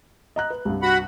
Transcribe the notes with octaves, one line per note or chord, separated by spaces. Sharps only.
D#5 A#5 F#6
B4
C2 G2
F#4 F#5 B5